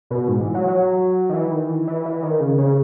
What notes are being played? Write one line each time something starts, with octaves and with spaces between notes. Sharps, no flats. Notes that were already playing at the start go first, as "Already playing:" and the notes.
B2
G#2
E3
F#3
F#3
D#3
E3
D#3
E3
E3
E3
D#3
C#3
C#3